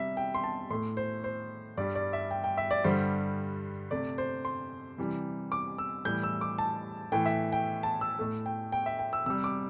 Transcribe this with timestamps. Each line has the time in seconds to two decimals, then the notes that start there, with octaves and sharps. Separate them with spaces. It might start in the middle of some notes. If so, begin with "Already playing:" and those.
Already playing: C3 G3 E5
0.17 G5
0.34 C6
0.44 A5
0.70 A2 A3 C6
0.97 C5
1.24 C5
1.77 G2 G3 D5
1.95 D5
2.13 E5
2.31 G5
2.44 G5
2.58 E5
2.71 D5
2.84 G2 D3 G3 C5
3.91 C3 A3 D5
4.18 C5
4.45 C6
4.98 C3 E3 G3
5.52 D6
5.78 E6
6.05 A2 E3 G3 G6
6.23 E6
6.41 D6
6.58 A5
7.12 A2 E3 A3 G5
7.26 E5
7.52 G5
7.83 A5
8.01 E6
8.19 A2 A3
8.46 G5
8.72 G5
8.86 E5
8.99 G5
9.13 E6
9.26 C3 G3 E6
9.44 D6